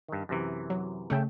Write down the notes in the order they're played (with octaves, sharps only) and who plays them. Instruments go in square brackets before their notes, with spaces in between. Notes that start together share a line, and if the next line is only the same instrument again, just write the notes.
[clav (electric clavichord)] G2 D#3
F#2 C3 E3
[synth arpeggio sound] F#3
[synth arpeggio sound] C#3 A3 [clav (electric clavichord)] E5 G5